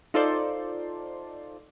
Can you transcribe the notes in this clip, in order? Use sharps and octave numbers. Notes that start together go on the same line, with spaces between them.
D#4 F4 A4 C5 D5 C6